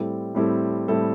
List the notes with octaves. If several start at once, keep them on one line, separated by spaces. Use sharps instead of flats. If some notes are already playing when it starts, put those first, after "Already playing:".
Already playing: A2 G3 C4 E4 A4
A2 G3 C4 E4 A4
A2 G3 C4 E4 A4